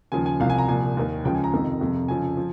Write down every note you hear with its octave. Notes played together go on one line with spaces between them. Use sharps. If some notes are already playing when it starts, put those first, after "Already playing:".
D#2 C#3 F3 G#5
G#5
C2 C3 F3 F5
G#5
A#5
C2 A#2 F3 G#5
D#2 D#3
C#2 C#3 F3 G5
G#5
A#5
F2 C3 D#3
F2 C3 F3
F2 C#3 F3 G#5
F3